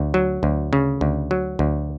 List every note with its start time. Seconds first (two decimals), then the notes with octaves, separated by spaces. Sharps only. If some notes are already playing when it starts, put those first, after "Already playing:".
Already playing: D2
0.14 F#3
0.43 D2
0.73 C#3
1.01 D2
1.31 F#3
1.59 D2